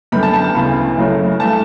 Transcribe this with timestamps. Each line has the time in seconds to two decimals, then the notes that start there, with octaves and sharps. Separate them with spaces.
0.12 F#2 D3 G3 B3 B5
0.23 A5
0.33 A5
0.44 A5
0.54 D2 C#3 E3 B3 B5
0.97 F#2 C#3 F#3 A3
1.39 G2 E3 A3 A5